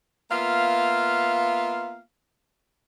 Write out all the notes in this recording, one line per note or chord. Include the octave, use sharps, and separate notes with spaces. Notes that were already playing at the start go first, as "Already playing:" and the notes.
A#3 B3 F4 E5 F5